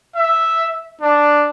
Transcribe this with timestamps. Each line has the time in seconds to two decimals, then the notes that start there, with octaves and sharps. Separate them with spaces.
0.16 E5
1.01 D4